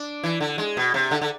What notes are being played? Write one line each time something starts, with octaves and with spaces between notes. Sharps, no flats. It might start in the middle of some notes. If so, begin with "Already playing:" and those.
Already playing: D4
E3
D3
G#3
B2
C3
D3
D3